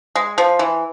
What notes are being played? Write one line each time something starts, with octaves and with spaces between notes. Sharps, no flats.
G#3
F3
E3